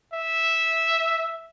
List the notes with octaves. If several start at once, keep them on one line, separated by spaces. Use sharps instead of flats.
E5